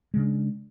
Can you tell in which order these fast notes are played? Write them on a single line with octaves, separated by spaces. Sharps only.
G#3 C#3 D4